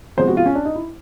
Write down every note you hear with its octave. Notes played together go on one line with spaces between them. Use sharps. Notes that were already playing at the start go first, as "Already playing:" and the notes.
C3 F3 G#3 B3 C5
F#4
F4
C#4
D4
D#4
E4